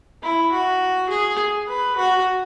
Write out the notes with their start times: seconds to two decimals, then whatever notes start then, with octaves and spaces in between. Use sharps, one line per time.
0.23 E4
0.52 F#4
1.10 G#4
1.68 B4
1.97 F#4